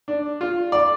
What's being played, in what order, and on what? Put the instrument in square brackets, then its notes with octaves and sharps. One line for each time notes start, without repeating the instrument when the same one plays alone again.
[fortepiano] D4
F4
D5